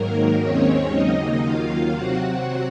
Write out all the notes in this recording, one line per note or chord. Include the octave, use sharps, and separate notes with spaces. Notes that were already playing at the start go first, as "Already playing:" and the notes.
Already playing: G#2 D#3 F#3 A#3 A#4
D#2 D#3 G#3 C4 C#4 C#5
D#2 C#3 F#3 A#3 D#4 D#5
D#2 D#3 F#3 A#3 F4 F5
C3 F#3 C4 F#4 F#5